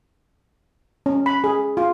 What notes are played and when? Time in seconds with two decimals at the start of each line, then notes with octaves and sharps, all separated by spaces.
1.06 C#4
1.26 B5
1.44 G#4
1.77 F4